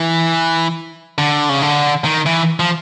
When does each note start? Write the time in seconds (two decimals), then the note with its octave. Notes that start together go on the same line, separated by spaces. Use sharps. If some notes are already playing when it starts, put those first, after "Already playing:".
Already playing: E3
1.18 D3
1.49 C#3
1.62 D3
2.05 D#3
2.26 E3
2.60 F3